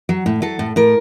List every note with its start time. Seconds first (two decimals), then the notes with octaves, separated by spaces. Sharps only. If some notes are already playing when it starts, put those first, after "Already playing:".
0.09 F#3
0.26 A2
0.42 F#3 A4
0.59 A2
0.76 A2 A#4